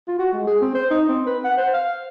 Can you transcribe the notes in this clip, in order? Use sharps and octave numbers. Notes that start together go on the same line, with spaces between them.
F4
F#4
G#3
G#4
C4
C5
D#4
C4
B4
F#5
C5
F5